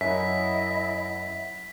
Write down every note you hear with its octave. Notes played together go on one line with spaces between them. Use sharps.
F#2 E4 D#5 E5 F#5 B6